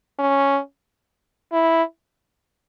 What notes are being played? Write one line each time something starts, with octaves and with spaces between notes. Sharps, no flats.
C#4
E4